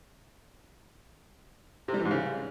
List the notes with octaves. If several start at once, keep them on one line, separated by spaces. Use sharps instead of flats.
C3
G3
E3
G#2
C#3